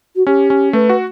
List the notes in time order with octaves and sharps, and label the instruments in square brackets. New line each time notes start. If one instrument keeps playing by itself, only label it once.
[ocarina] F#4
[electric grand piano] C#4 [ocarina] G4
[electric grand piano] C#4
[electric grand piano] A3 [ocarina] B4
[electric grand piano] F#4